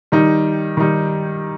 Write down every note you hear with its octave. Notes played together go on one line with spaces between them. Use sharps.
D#3 G3 D#4
D#3 G3 D#4